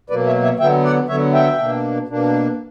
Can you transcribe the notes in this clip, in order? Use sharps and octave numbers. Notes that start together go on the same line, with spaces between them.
B2 F#3 A#3 B4 D5
C#5 E5
C#5 E5
D3 F#3 B3 E5 G5
D5 F#5
D3 F#3 B3 C#5 E5
E5 G5
B2 A#3 D4
B2 A#3 D4